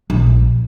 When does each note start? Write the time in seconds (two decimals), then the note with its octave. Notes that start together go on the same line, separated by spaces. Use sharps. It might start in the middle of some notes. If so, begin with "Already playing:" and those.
0.10 A#1